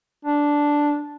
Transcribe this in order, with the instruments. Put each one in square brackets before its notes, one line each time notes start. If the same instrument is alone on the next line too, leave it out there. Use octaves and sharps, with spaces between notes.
[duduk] D4